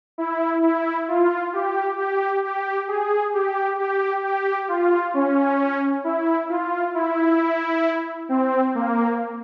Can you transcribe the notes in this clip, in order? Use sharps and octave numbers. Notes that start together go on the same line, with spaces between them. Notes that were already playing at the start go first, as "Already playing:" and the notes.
E4
E4
F4
G4
G4
G4
G#4
G4
G4
G4
F4
C#4
E4
F4
E4
C4
A#3